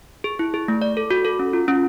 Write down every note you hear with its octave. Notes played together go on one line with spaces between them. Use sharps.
G#4
E4
G#4
A3
D5
A4
F#4
A4
C#4
F4
C#4